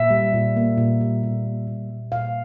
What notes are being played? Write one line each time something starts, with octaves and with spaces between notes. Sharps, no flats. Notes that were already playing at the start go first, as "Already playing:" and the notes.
Already playing: A#2 E5
G3
A#2
A#3
A#2
G3
A#2
A#3
A#2
G3
A#2 F5